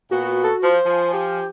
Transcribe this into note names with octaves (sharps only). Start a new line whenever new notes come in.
A#2 B3 F#4
A4
F3 C5
F3 G#5
G4